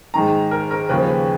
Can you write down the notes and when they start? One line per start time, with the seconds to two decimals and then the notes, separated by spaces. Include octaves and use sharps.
0.14 G#2 D#3 A#5
0.51 A#4
0.71 A#4
0.89 D#2 C#3 F3 B4